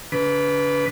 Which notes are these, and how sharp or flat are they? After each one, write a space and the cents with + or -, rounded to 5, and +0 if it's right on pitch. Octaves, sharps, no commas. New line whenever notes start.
D3 -40 B4 +0 D6 +15